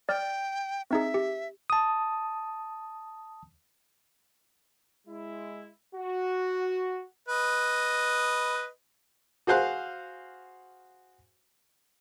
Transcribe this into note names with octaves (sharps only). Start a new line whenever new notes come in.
D5 G5 F6
C4 D#4 G#4 E5
G4
A5 D#6
G#3 E4
F#4
B4 D#5
F#4 G#4 C5 F5 F#6